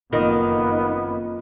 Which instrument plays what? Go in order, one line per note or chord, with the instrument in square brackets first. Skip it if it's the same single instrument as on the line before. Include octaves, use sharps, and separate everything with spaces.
[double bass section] F#1 F2 A#3 [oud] D#3 [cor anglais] B3 [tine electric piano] F4 D#5